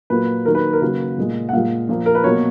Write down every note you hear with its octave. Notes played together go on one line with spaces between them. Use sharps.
A#2 F#3 A#3 B4
D#3 F#3 A#3 A#4
B4
A#4
C#3 F#3 A#3 B4
A#2 G#3
F#5
A#2 G#3 F5
A#2 F3 A#3
A#4
B4
B2 F#3 A#3 C#5